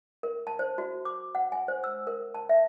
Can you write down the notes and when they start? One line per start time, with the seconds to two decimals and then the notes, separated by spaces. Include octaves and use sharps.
0.23 A#4
0.47 A5
0.59 C5
0.78 F#4
1.05 D6
1.35 F#5
1.52 G#5
1.68 C5
1.84 E6
2.07 A#4
2.35 A5
2.49 E5